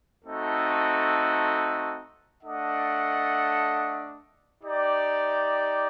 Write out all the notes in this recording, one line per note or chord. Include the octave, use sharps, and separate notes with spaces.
A3 C4 D#4 F#4 A4
A3 D4 A4 D#5 F#5
D#4 G4 D5